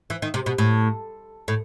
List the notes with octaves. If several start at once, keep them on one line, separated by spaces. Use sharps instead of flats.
E3
D#3
C3
B2
A2
A2